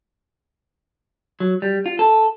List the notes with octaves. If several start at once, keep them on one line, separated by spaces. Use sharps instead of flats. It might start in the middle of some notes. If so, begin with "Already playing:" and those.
F#3
G3
F4
A4